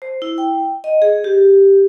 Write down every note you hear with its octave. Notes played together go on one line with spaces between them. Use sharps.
C5
E4
G5
D#5
G#4
G4